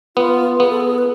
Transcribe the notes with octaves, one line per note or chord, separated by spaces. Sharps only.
B3 F4
B3 G#4
A4
G#4
B4